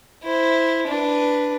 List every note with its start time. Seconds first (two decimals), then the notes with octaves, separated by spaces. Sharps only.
0.23 E4 C5
0.87 D4 B4